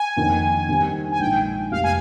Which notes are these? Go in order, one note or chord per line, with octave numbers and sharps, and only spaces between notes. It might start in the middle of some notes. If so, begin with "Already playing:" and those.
Already playing: G#5
F2 D#3 A#3 D#4 A#4
D#3 G3 C4 D#4
G#5
A#1 G#2 F3 A#3 D#4 G5
F1 F2 C3 G3 A#3 F5
G#5